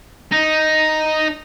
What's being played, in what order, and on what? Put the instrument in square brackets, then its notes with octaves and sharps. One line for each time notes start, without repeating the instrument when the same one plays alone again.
[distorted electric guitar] D#4